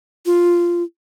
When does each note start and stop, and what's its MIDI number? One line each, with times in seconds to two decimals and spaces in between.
0.26 0.83 65